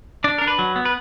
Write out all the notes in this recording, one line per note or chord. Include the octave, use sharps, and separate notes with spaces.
D4 D5
D4 A#4
B4
F#3
B3
B4